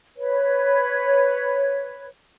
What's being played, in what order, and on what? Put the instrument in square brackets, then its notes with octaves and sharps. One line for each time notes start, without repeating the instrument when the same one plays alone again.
[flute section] B4 C#5